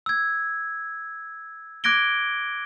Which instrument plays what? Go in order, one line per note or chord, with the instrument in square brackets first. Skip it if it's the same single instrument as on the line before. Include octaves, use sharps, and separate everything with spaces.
[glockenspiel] E6 G#6
D6 F#6 G#6 A#6 D7 G7